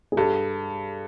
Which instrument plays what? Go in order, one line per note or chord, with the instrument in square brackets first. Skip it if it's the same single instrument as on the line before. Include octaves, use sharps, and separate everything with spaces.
[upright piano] G#4
[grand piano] G2 [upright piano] G4 A4